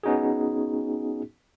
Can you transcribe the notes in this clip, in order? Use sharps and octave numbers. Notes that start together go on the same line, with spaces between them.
B3 C#4 D#4 F#4 G#4